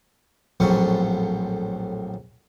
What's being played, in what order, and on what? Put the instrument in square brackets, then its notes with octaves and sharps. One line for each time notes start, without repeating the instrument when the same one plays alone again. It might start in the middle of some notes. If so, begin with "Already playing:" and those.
[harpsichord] A#1 F2 A2 F#3 C#4 C#6